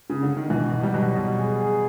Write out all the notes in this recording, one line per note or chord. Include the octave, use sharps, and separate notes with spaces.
C#3
D3
D#3
B2 E3
B2
G3
B2 F#3
B2
G#4
G#4